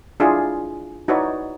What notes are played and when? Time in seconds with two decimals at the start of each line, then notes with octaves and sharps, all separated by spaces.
0.20 D4 E4 F4 G#4
1.08 D#4 E4 F#4 B4 C#5 D5